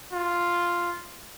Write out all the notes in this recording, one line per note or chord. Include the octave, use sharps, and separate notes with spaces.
F4